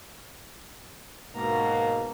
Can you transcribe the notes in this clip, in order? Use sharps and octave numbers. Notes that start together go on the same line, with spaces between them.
G#2 B2 A#3 A#5